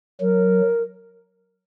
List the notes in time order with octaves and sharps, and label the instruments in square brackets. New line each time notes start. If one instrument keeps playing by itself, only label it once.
[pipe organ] F#3 [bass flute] A#4